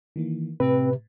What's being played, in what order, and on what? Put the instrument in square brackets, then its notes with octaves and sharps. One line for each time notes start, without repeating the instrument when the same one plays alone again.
[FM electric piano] D#3 E3 A#3
[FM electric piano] A2 [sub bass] C3 [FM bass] C4 [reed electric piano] B4